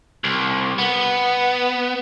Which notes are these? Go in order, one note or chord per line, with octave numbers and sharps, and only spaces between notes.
C2
B3